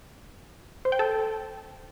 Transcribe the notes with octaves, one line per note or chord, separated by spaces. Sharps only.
C5
G5
A4